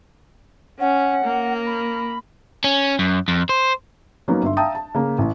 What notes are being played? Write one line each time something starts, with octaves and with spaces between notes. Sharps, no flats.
C#4 F#5
A#3
B5
C#4
F#2
F2
C5
F#3 A#3 B3 C#4 D#4
G1 E5 C6
E5 F5 G5 A5 A#5 D#6
A5
C#3 A#3
A1